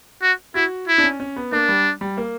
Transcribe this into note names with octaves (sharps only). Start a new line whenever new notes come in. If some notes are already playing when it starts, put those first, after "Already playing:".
F#4
E4 F#4
E4
D4
C#4
C#4
B3
A#3 D4
G3
G3
A#3